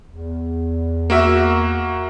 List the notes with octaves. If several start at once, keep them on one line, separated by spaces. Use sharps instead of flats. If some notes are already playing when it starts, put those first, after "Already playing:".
E2
A#3 F#4 E5